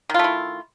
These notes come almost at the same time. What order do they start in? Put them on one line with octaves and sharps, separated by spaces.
D#3 F4 A3 E4